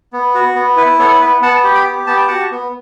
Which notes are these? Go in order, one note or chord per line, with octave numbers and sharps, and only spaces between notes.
B3
F#4
B3
E4 B4
B3 A4 C#5
B3 B4
B3 F#5 A5
G4
G5 B5
G4
B3 A5
G5
F#4 F#5 A5
B3